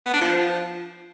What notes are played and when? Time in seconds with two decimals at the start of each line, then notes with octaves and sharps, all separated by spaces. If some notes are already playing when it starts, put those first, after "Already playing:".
0.06 B3
0.13 D4
0.21 F3